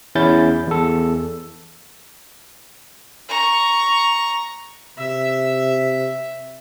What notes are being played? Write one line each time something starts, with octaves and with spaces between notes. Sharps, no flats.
E2 C#4 E4 G6 A6
E2 A4
A#5 C#6
C3 E5